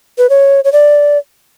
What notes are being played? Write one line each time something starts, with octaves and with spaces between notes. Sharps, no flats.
B4
C#5
C#5
D5